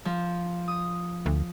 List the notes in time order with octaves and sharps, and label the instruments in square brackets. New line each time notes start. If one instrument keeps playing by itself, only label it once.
[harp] F3
D#6
[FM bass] D2